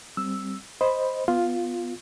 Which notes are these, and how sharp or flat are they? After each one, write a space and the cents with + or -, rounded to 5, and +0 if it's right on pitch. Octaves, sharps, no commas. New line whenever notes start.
G3 +0 C4 +0 E6 +0
C5 +0 D#5 +0 B5 +0
B3 +5 F4 +5